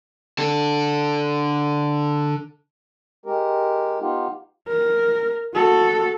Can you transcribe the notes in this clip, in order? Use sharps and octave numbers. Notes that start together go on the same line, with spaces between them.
D3 A4
G#3 G4 A#4
B3 D#4 F4 G4
A#4
F#4 A4